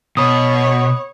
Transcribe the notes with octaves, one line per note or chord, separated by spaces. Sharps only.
B2 C#5 B5 D#6